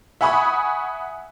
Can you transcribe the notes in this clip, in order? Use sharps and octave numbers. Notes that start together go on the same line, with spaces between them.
E5 F#5 G#5 B5 C#6 D#6